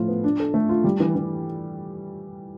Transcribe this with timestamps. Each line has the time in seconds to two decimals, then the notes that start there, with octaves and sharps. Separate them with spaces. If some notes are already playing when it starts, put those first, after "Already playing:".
Already playing: A2 F3 F4
0.08 B3
0.24 D4
0.40 A4
0.54 A3
0.69 F4
0.84 G3
1.00 E3
1.15 E3